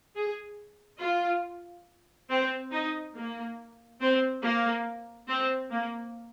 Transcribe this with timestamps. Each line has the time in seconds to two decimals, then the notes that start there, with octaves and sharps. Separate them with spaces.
0.16 G#4
1.01 F4
2.30 C4
2.72 D#4
3.16 A#3
4.01 C4
4.44 A#3
5.29 C4
5.71 A#3